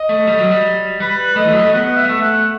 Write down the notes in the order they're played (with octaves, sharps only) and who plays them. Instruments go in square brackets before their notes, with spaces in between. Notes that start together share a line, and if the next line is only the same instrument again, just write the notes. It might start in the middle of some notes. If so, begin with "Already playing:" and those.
Already playing: [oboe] D#5
[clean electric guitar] A3
G3
F#3
G3
[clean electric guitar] G3 [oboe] B4
[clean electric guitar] A3 [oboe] D#5
[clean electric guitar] E3
F#3
G3
A3
[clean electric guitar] B3 [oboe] F#5
[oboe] E5
[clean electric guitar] G3
A3
[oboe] F#5